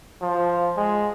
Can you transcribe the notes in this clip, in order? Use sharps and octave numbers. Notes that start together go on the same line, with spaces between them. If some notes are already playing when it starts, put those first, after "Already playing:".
F3
G#3